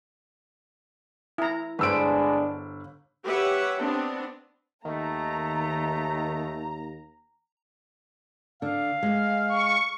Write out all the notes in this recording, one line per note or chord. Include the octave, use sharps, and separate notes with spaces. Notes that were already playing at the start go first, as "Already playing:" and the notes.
E4 A#5
G1 G#3 B3 D4 B4 C5 E6 D7
G4 B4 C#5 E5 F#5
B3 C4 D4
D#2 D#3 A3 A#5
D3 F5
G#3
C#6